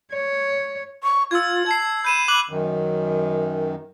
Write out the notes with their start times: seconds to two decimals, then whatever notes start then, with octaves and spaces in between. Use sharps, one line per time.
0.13 C#5
1.03 C#6
1.31 F4 E6 G#6
1.66 A5 G#6 C7
2.05 B5 G6 D#7 E7
2.28 D6 F#6 F#7
2.50 F#2 D#3